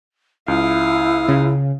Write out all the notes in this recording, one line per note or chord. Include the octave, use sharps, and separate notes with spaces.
C#2 E4 F5 D#6
C#3